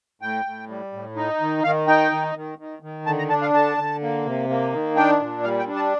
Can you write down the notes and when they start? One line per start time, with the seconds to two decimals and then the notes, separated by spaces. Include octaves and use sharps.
0.21 A2 G5
0.45 A2
0.69 G3
0.93 A2
1.16 D#4
1.41 D#3
1.64 D#3 F5
1.87 D#4 G5
2.12 D#3
2.35 D#3
2.58 D#3
2.82 D#3
3.06 D3 A5
3.18 A#5
3.29 D4 A5
3.42 F5
3.54 D3 A5
3.78 D3
4.02 A#3
4.25 C3
4.49 A#3
4.72 D#3
4.96 D4 G5
5.20 A#2
5.44 G3 F5
5.59 G5
5.67 D4
5.76 A5